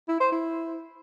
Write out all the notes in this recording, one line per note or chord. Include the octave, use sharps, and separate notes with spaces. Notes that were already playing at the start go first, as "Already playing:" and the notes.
E4
C5
E4